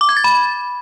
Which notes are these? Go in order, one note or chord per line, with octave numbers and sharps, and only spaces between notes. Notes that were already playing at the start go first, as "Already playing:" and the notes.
D6
G#6
A6
B5